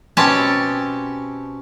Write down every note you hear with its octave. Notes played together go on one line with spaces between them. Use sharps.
B2 C4 C#4 G4 A5